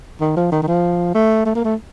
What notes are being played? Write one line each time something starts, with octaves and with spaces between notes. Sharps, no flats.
D#3
F3
D#3
D#3
F3
A3
A3
A#3
A3